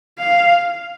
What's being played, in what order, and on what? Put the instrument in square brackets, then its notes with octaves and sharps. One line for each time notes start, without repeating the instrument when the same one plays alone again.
[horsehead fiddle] F5